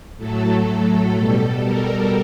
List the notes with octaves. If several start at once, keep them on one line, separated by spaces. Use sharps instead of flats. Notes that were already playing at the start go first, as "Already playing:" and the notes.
A2 F#3 A3 A4
A4
B2 G3
A#4